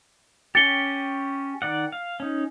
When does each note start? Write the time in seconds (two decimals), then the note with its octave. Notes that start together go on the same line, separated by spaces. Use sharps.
0.55 C#4 G4 A6 C#7 G7
1.62 D#3 D5 F#5
1.92 F5
2.20 C#4 D#4